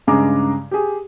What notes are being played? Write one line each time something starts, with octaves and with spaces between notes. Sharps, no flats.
G2 C#3 G#3 G#4 A#5 D6
G4 G#4